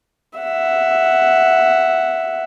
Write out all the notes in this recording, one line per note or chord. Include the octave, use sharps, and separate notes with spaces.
E5 F#5